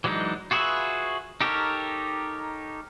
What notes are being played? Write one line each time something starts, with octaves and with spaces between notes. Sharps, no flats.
E3 F#3 G#3 D4 D#4
F4 F#4 G#4 B4 E5
D#4 G4 A4 A#4 C#5